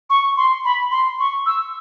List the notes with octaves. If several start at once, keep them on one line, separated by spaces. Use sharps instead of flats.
C#6
C6
B5
C6
C#6
E6